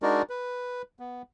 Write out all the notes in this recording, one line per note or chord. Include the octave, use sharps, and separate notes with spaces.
G#3 D4 D#4 F#4 A#4 D5
B4
B3